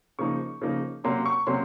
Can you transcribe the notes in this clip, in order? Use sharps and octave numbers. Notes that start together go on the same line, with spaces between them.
C#3 F3 A#3 D#4 C#6
C#3 F3 A#3 D#4
C3 F#3 A#3 C#4 C6
C#6
C3 F#3 A#3 C#4 C6